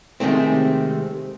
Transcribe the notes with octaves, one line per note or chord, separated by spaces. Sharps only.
C3 D#3 G#3 A3 C4